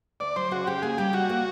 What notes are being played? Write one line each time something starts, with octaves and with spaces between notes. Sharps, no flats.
D2 D5
F#3 C5
C#3 F#4
C#3 G4
A#3 G#4
G3 G4
G3 F#4
A#3